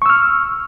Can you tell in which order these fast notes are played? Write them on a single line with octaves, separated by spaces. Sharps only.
C#6 E6 F6